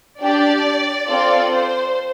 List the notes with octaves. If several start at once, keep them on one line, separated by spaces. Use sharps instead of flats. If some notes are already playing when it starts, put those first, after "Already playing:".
D4 G4 D5
C4 F4 A4 D5
C5